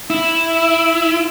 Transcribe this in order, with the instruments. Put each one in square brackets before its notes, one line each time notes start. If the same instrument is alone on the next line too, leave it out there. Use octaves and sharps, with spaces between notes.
[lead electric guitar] E4